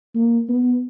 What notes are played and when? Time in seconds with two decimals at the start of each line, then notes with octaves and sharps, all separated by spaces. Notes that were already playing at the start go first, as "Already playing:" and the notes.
0.15 A#3
0.49 B3